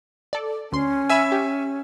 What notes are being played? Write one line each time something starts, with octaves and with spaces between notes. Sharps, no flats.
A4 D5
D2 C#4 C6
E5 G#5 B5 E6
G4